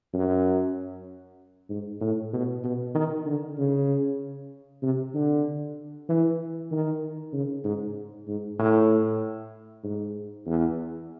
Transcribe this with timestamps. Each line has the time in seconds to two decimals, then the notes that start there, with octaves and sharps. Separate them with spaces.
0.14 F#2
1.69 G#2
2.01 A2
2.33 B2
2.64 B2
2.95 D#3
3.26 D3
3.58 C#3
4.82 C3
5.14 D3
6.09 E3
6.71 D#3
7.33 C#3
7.64 G#2
8.27 G#2
8.59 A2
9.84 G#2
10.46 E2